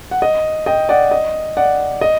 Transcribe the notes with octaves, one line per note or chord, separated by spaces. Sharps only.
F#5
D#5
D#5 G5
D5 F#5
D#5
D5 F#5
D#5